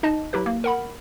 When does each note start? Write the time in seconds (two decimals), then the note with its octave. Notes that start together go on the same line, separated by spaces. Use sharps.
0.03 D#4 D#5 A5
0.33 F#3 E4 G4 B4
0.46 A#3
0.64 A#4 F#5 B5